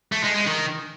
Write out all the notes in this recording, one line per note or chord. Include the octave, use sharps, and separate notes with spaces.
A3
G#3
G#3
D#3